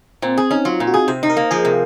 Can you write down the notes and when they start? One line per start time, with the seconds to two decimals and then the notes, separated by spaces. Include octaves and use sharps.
0.22 A#2 C4
0.37 G#4
0.51 C#4 D#4
0.65 F#3 F4
0.80 A#2
0.87 F#4
0.94 G#4
1.08 C3 C5
1.23 D#4
1.30 A#4
1.37 A#3
1.51 F3 G#4
1.65 C3